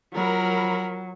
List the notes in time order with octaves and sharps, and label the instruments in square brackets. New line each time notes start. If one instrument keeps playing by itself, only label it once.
[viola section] F3 A#4 B5 [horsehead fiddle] F#3